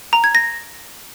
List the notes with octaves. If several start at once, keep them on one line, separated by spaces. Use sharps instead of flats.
A#5
G#6
A#6